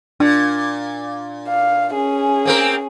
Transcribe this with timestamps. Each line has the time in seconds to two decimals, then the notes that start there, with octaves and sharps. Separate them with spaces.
0.20 A#2 D4
1.48 F5
1.93 C#4 G#4
2.45 A#3 C4 A#4